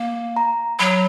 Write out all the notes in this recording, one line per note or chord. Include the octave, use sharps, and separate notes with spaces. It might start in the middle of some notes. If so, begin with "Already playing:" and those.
Already playing: A#3
A#5
F#3 B5